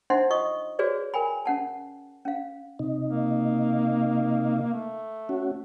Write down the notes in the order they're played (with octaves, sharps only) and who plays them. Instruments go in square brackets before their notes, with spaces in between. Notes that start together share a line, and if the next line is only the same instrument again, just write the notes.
[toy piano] D4 D#4 C5 E5 F#5 C6
F4 D#5 C#6 D#6
F#4 G#4 B4 C#5 D5
A#4 G5 G#5 B5
C#4 F#5 A5
C#4 F5
[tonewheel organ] C3 D#4
[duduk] A#3
A3
[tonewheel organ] C#4 F#4